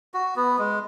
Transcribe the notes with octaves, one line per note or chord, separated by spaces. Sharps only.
F#4
B3
G#3